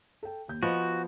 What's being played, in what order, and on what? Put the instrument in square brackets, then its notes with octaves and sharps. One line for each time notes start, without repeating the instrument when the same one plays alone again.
[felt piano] A4 G5
D#2 G6
[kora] F3 B3 [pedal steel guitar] F#4 [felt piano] C5 D#5 F5